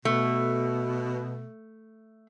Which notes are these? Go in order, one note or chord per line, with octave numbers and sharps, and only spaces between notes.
B2 A3